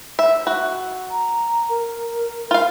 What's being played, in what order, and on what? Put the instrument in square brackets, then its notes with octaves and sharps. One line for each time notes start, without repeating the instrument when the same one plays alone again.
[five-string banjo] E5
F#4
[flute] A#5
A#4
[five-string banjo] F4 F5